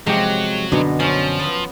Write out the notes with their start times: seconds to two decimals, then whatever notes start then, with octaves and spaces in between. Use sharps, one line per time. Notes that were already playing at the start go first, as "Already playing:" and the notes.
0.07 C3 F3 F#3 G#3 D#4 G4
0.72 F#2 B2 D3 G#3 B3 D#4
1.00 F3 F#3 C#4 C5
1.40 B3 E5